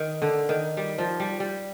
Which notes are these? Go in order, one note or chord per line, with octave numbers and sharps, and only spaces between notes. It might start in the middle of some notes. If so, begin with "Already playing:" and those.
Already playing: D#3
D3
D#3
G3
F3
G3
G3